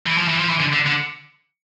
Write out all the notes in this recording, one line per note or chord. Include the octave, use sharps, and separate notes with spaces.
E3
F3
E3
F3
E3
D3
D3
D3